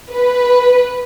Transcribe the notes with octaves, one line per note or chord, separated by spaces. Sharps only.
B4